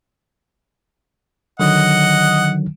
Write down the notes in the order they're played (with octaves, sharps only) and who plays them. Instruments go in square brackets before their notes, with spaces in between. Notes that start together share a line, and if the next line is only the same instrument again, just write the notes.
[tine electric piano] D3 D#3 F#3 [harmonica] D#5 F#5